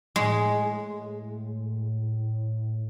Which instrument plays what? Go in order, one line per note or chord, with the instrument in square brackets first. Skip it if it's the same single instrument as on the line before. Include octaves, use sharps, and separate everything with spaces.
[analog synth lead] A2 [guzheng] G#3